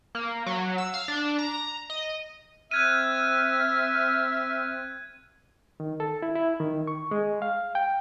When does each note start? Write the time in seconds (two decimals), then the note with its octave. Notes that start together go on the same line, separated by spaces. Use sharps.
0.15 A#3
0.46 F#3
0.78 E6
0.94 F5
1.08 D4
1.39 A#5
1.90 D#5
2.71 C4 E5 F6 F#6 G#6 D#7
5.80 D#3
6.00 A4
6.22 E4
6.36 E4
6.60 D#3
6.87 C#6
7.11 G#3
7.42 F5
7.75 G5